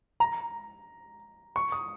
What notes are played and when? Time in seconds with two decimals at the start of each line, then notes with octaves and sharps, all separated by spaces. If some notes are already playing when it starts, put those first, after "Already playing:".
0.20 A#5
1.56 C#6
1.72 D#6